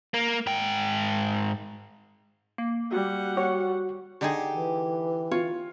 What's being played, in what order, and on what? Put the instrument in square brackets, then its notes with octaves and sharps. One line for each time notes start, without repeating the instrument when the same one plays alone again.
[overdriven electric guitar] A#3
G#2 G5
[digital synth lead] A#3
[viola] G3 F#5 [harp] F#4
[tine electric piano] F#4 [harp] C#5
[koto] D3 D#4 G#4 [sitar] G4
[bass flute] E3
[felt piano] F4 [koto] C#5